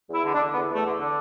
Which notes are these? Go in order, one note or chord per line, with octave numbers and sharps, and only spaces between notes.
E2
E4
D3
D4
D3
E2 B3
E2
A3
D3
D3